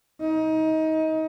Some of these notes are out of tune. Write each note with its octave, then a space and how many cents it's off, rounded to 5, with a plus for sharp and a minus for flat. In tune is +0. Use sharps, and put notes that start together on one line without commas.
D#4 +25